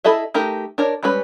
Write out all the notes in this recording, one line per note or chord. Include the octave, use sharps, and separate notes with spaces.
E4 G#4 A4 D#5 E5
A3 D#4 G4 A#4
D4 A#4 C#5
G3 G#3 C#4 B4